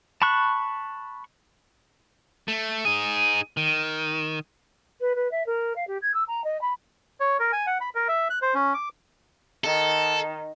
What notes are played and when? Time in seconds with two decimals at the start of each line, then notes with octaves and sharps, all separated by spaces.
0.22 A5 B5 C#6 F#6
2.48 A3
2.85 D#4 G#4
3.57 D#3
5.00 B4
5.15 B4
5.31 E5
5.46 A#4
5.76 F5
5.87 G4
6.02 G#6
6.14 E6
6.27 A#5
6.44 D#5
6.61 B5
7.20 C#5
7.39 A#4
7.52 G#5
7.67 F#5
7.81 B5
7.95 A#4
8.09 E5
8.30 F#6
8.42 C5
8.54 C#4
8.74 D6
9.64 D#3 A4